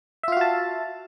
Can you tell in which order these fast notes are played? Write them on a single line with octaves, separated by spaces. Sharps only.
E5 F4 F5 F#4 A5